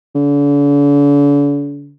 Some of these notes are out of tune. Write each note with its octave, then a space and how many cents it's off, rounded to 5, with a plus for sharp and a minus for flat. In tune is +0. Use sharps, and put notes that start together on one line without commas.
D3 -45